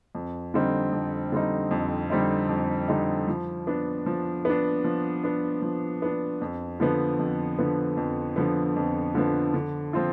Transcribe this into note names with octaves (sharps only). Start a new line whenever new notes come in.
F2
D3 G3 C4 D#4
F2
D3 G3 C4 D#4
F2
D3 G3 C4 D#4
F2
D3 G3 C4 D#4
F3
B3 D4
F3
B3 D4
F3
B3 D4
F3
B3 D4
F2
D3 F3 B3
F2
D3 F3 B3
F2
D3 F3 B3
F2
D3 F3 B3
D3
F3 C4 F4